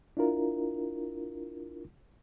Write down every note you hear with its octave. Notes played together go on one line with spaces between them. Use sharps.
D4 E4 F4 A#4